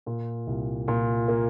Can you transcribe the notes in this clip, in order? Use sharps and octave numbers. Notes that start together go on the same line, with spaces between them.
A#2
C2
A#2
A#3